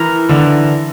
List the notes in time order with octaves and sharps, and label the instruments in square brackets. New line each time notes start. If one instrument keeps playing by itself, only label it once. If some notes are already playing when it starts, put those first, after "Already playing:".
Already playing: [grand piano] E3 E4 [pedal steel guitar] A#4
[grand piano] D3 D4 [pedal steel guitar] E3